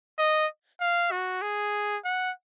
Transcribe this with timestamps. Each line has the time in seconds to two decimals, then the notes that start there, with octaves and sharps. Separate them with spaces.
0.18 D#5
0.81 F5
1.11 F#4
1.42 G#4
2.04 F#5